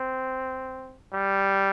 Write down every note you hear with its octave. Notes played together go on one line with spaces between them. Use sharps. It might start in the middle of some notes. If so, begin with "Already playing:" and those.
Already playing: C4
G3